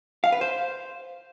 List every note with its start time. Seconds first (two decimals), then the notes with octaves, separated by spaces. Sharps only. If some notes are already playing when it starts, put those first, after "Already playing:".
0.24 F5
0.32 B4
0.41 C5